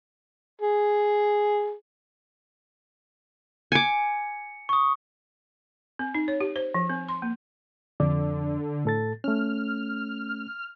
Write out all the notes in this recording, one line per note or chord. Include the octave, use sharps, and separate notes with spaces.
G#4
G#5 D6 C#7
C#6 D#6
C4
D#4
C#5
G4
C5
F3
C4
C6
A#3
F2 D3 D5
A2 A4 A6
A3 C#4 F6